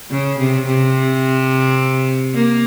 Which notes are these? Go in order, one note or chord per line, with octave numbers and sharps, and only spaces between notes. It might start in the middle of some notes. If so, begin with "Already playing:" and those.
C#3
C3
C3
A#3